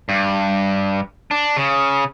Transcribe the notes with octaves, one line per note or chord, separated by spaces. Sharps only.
G2
D4
C#3